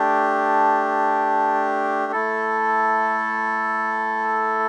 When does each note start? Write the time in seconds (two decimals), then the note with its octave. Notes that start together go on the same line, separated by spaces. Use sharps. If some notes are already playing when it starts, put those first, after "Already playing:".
Already playing: A3 D4 G4
2.12 A3 E4 A4